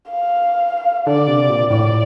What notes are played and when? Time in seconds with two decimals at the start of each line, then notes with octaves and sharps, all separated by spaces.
0.10 F5
1.06 D3 D5
1.28 C3
1.49 A#2
1.70 A2 D5